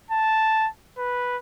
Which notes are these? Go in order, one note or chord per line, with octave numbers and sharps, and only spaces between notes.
A5
B4